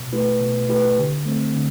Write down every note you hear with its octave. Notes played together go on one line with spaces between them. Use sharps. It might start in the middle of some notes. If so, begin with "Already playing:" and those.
Already playing: B2
A3 E4 G4 B4
B2
A3 E4 G4 B4
D3
A3 C4
D3